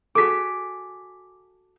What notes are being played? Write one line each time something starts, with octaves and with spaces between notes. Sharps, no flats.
F#4 G#4 A4 D6 B6